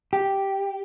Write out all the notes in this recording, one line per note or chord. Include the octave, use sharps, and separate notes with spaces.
G4